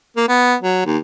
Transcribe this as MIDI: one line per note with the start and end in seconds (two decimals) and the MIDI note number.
0.17 0.27 58
0.28 0.55 59
0.63 0.83 54
0.86 0.98 39